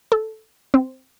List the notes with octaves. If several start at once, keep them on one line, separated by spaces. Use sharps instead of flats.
A4
C4